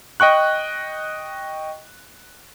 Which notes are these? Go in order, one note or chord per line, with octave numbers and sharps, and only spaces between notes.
D#5 G5 C#6 F#6